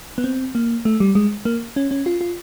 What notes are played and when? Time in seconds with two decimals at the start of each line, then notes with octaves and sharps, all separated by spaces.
0.18 B3
0.24 C4
0.55 A#3
0.85 A3
1.00 G3
1.15 G#3
1.45 A#3
1.76 C#4
1.91 C#4
2.06 F4
2.21 F4